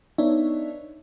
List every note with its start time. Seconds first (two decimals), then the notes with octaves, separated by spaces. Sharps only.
0.18 B3 D4 D#4 C#5 E5